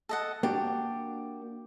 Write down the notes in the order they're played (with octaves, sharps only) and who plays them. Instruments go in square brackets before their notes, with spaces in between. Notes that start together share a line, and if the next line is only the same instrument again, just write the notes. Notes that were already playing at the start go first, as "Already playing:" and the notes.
[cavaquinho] A4 D#5 F#5
[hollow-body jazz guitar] A#3 D4 F#4 [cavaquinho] G4